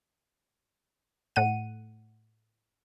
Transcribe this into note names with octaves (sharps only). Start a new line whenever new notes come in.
A2 F#5 D#7